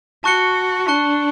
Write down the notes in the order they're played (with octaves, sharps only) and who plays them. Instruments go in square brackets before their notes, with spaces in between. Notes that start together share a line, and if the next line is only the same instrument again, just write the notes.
[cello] F#4 [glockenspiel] A5 C#6 F#6 C#7 G7
[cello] D4 [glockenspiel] A5 C#6 F#6 C#7 G7